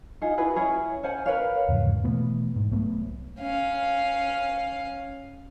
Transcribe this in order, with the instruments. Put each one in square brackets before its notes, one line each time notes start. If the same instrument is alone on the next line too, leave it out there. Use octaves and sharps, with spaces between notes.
[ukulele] D#4 F4 G#4
E4 F#4 G#4 B4
C#4 E4 G#4 C#5
C#4 C5 F#5 G#5
A#4 B4 C#5 F5
[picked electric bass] E2 G#2 C#3 F3
B2 E3 A3 B3
G#2
C2 F#3 A3 B3
[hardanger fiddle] C#4 F5